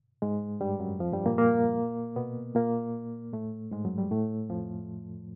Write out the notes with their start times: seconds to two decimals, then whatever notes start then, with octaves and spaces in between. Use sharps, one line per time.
0.22 G#2 G#3
0.61 G2 G3
0.80 F#2 F#3
0.99 F2 F3
1.13 G2 G3
1.26 A#2 A#3
1.38 A#2 A#3
2.16 B2 B3
2.55 A#2 A#3
3.33 A2 A3
3.71 G#2 G#3
3.85 F#2 F#3
3.97 G2 G3
4.11 A2 A3
4.49 F2 F3